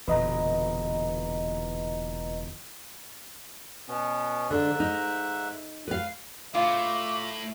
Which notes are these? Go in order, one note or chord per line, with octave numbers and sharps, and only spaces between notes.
E1 E2 A#2 D3 B4 D#5 A#5
B2 B3 C#4
G#2 D3 E5 F#6
D#4
B4 F5
A2 F4 E5 D6